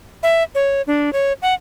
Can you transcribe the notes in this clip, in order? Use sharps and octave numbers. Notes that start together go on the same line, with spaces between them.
E5
C#5
D4
C#5
F#5